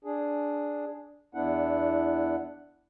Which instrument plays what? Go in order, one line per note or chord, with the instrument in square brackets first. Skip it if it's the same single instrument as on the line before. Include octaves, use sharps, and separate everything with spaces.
[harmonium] D4 G#4
E2 B3 D4 E4 F#5